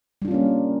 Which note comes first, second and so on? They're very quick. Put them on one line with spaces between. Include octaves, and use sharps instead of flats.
G3 D4 F4 C#4 A#3